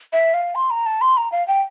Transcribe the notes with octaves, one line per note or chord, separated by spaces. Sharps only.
E5
F5
C6
A#5
A5
C6
A#5
F5
G5